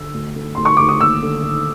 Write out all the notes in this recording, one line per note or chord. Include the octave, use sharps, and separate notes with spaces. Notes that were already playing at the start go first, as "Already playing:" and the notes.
Already playing: D3 E6
D2
D3
D2 C6
C#6
D2 D6
D#6
D#2 E6
D3
D3